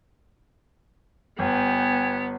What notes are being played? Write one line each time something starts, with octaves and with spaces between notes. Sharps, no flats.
G1 B3 G5 G#5